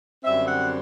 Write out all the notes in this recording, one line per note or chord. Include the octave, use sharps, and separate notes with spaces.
F#2 D3 G3 C4 E5
F#5